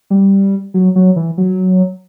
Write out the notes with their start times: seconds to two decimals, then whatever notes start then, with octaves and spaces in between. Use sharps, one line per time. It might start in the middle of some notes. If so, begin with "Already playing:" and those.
0.10 G3
0.74 F#3
0.96 F#3
1.16 E3
1.38 F#3